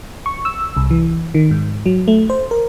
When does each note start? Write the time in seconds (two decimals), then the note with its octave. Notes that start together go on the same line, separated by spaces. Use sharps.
0.26 C#6
0.45 E6
0.77 C2
0.91 E3
1.34 D#3
1.51 G#2
1.86 F#3
2.08 A3
2.30 C5
2.51 A#4